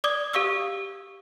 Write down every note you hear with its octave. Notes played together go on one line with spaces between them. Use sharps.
D5 D6 D#6 G#6 G7
G4 F5 C#6 D#6 E6